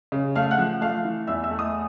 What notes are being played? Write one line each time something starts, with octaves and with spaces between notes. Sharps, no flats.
C#3
A3 F5 F6
F#5 F#6
F3
A3 F5 F6
E3
E2 E5 E6
E5 E6
A3
D#5 D#6